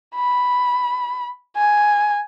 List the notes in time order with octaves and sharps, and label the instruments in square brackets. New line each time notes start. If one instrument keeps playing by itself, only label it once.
[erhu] B5
G#5